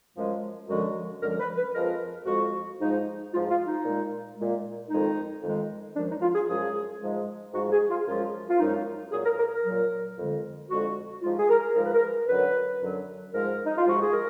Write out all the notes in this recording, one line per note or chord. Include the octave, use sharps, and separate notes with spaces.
F#2 F3 G#3
F#2 D3 F3 G#3 F#4
F#2 D3 F3 G#3 A#4
B4
B4
F2 F3 G#3 A#4
F2 F3 G#3 F#4
G#2 F3 G#3 D#4
G#2 F3 G#3 F4
F4
D#4
A#2 G#3
A#2 G#3
F2 D#3 G#3 D#4
F2 D#3 G#3
F#2 F3 G#3 D4
D#4
F4
G#4
F#2 F3 G#3 G#4
G#2 F3 G#3
G#2 F3 G#3 F#4
G#4
F4
F#2 F3 G#3 F4
F4
F#2 F3 G#3 D#4
A#2 F#3 G#4
A#4
A#4
A#4
A#2 F#3
F2 D3 G#3
F2 D3 G#3 F#4
G#2 F3 G#3 F4
G#4
A#4
G#2 F3 G#3 A#4
B4
A#4
F#2 D3 F#3 B4
F#2 D3 F#3
G#2 F3 G#3 A#4
D#4
F4
G#2 F3 G#3 F#4
G#4
A#4